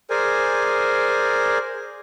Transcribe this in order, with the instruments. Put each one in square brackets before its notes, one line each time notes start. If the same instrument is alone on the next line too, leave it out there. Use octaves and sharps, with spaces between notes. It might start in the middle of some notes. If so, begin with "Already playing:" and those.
[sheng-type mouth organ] G#4 A#4 C5 D5 G#5